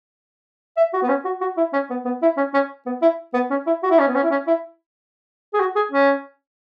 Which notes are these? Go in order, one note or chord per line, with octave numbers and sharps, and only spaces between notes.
E5
F#4
B3
C#4
F#4
F#4
E4
C#4
B3
B3
E4
C#4
C#4
B3
E4
B3
C#4
E4
F#4
E4
C#4
B3
C#4
E4
C#4
E4
G#4
F#4
G#4
C#4